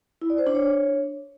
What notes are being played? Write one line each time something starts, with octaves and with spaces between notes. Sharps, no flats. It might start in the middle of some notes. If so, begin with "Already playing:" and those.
E4
D5
C5
D4
C#5